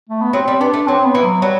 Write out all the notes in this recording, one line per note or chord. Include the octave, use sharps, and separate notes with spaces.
A3
B3
F#3 C4
G3
B3 D4
A3
F#3 C4
B3
E3
F#3
F#3 G3